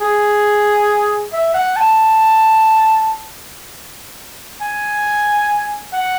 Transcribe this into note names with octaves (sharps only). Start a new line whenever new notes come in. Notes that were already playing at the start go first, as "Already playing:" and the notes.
G#4
E5
F#5
A5
G#5
F#5